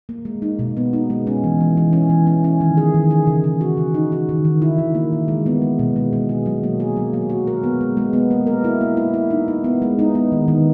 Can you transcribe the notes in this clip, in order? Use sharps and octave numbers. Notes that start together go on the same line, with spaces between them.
A#3
G#3
D#4
B2
B3
D#4
G#3
C#4
E3
E3
E3
C#4
E3
C#4
C#4
D#3
G#4
D#3
G#4
C#3
C#3
F#4
C#3
D#4
F#4
D#3
D#3
E4
D#3
A#3
D#3
G#3
B3
G#3
B2
G#3
B2
G#4
F#3
A#3
G#4
F#3
A#3
F#4
A#4
B3
G#3
G#3
B3
A#3
A#4
E4
A#3
E4
E4
D#4
D#4
B3
G#3
D#4
B3
D#3
D#3